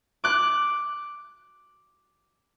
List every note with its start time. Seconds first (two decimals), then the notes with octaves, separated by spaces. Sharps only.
0.24 D6 F#6